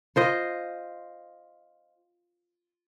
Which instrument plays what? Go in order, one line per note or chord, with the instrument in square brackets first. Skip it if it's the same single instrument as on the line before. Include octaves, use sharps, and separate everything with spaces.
[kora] F4 C5 D#5